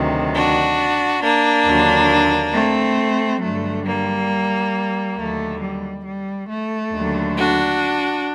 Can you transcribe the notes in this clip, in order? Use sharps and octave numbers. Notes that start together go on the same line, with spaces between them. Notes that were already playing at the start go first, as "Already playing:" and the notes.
Already playing: D2 C3 D#3 F#3
D4 F#4
A#3 D4
D#2 D3 F#3
A3 C4
G2 D3 F#3 A3
G3 A#3
D#2 D3 F#3 A3
G3
G3
A3
D#2 D3 F#3
D4 F#4